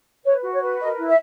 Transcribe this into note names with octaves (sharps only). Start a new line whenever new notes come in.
B4 C#5
F#4
C#5
B4
A#4 D#5
E4
E5